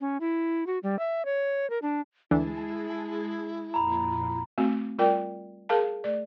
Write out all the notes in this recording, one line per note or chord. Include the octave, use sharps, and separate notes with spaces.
C#4
E4
F#4
G3
E5
C#5
A#4
D4
D2 E3 G#3 D4 E4 G#4 A5
F2 A#2 A#5 B5
A3 C4 F#4
G3 F4 A#4 D5 G5
G#4 A#4 F5 A5
A3 D5